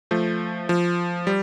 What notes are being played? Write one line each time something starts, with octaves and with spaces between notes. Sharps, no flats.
F3 A3
F3
G3